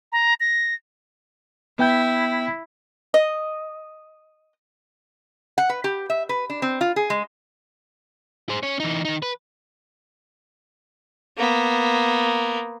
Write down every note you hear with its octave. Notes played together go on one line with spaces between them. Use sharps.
A#5
A#6
B3 E4 G5 G6
D#5
F#5
B4
G4
E5
B4
D4
C4
F4
G#4
G#3
G#4 C5
C#4 C#5
E3 D#4
D#3 D#4
B4
A#3 B3